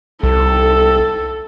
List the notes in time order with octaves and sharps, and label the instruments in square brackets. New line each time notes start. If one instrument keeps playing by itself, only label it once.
[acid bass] C2 [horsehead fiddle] A4